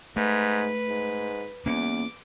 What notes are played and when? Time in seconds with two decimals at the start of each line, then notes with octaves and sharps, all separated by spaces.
0.16 G#2 A3 B4
0.88 G#2
1.66 E2 A#3 B3 C#4 D6